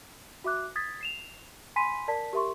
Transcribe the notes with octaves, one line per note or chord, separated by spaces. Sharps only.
F#4 E5 D6 F#6
D#6 G#6 A6 B6
C7 E7 F7
G#5 B5 C6 B6 D#7
A#4 D5 A5 B6
G4 A#4 E5 C6 C#6